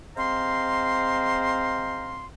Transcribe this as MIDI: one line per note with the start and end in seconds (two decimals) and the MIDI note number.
0.17 2.25 56
0.17 2.25 60
0.17 2.25 72
0.17 2.25 77
0.17 2.25 82
0.17 2.25 84